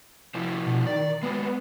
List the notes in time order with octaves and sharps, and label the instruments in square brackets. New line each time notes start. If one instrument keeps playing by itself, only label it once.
[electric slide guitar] C3 F3 E4
[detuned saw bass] B2
[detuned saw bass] D#3 [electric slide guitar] D5
[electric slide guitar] F#3 G#3 [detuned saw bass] B3